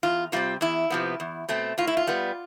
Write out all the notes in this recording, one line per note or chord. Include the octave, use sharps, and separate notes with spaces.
E2 F4
C3 G3 C4 F4
E2 E4
C3 F3 B3
E2
B2 A3 C4
A2 F4
E4
F4
G3 B3